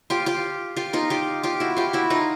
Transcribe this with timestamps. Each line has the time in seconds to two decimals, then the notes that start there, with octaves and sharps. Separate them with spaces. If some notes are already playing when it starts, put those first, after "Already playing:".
0.10 F4 G4
0.26 F4 G4
0.76 F4 G4
0.93 D#4 F4
1.10 F4 G4
1.43 F4 G4
1.60 E4 F#4
1.77 F4 G4
1.93 E4 F#4
2.10 D#4 F4